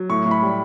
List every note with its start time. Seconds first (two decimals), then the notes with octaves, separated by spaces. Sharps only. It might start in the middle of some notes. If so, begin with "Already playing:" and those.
Already playing: F#3
0.09 A2 C#6
0.26 A2
0.31 B5
0.42 G3